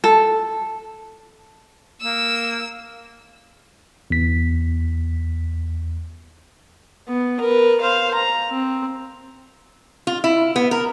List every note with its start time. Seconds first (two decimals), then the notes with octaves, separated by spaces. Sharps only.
0.04 A4
2.02 A#3 E6
4.10 E2 B6
7.08 B3
7.40 A#4 B4
7.81 C5 F5
8.14 A#5
8.50 C4
10.07 F4
10.24 E4
10.56 B3
10.71 A#4